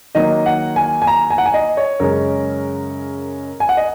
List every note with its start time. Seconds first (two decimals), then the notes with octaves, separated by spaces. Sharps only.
0.15 D#3 F#3 A#3 D#5
0.46 F#5
0.76 G#5
1.02 G#5
1.07 A#5
1.30 G#5
1.38 F#5
1.46 G#5
1.54 D#5
1.77 C#5
2.00 F#2 C#3 G#3 C#4 A#4
3.60 G#5
3.69 F#5
3.77 D#5